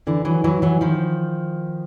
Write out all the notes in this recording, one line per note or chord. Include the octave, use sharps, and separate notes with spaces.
D3 E3
E3 F#3
E3 F#3
E3 F#3
D#3 F3